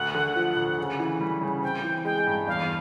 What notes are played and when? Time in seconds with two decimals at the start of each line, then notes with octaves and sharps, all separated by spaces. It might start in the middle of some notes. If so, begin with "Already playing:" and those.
Already playing: D2 F#5
0.14 D3
0.36 F3
0.56 D2
0.78 C#3
0.99 E3
1.20 G3
1.41 C#3
1.63 C4 G5
1.83 E3
2.05 G#3 G5
2.26 G2
2.47 E2 F5